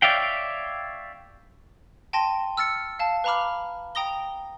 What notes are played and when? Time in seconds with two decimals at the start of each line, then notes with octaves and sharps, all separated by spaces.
0.02 C#5 D5 E5 F5 G5
2.13 G5 A5 C6 A#6 D#7
2.57 E6 F6 A6 C#7
2.99 F5 A5
3.24 B4 F5 A#5 B5 D6 F6
3.95 G5 A#5 D#6 A#6 G7